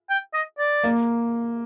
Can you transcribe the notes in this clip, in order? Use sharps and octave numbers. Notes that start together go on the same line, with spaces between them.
G5
D#5
D5
A#3